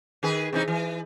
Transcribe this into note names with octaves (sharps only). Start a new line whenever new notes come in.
D#3 G#4 B4
C3 E3 D#4
E3